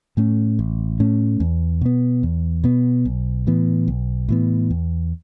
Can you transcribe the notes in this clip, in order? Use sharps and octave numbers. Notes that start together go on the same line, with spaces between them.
A2 A3 C#4
A1
A2 A3 C#4
E2
B2 B3
E2
B2 B3
B1
A2 E3 B3
B1
A2 E3 B3
E2